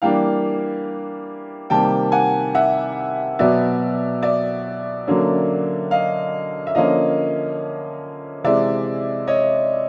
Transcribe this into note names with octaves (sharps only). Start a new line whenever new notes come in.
E3 G3 A#3 D4 F5 G5
C3 D#3 G3 A#3 G5 A5
F#5 G#5
E5 F#5
B2 F#3 B3 D5 E5
D5 E5
D3 F#3 A#3 C#4
D#5 F5
E5
D3 F3 A#3 C#4 D#5 F5
C3 E3 G#3 D5 E5
C#5 D#5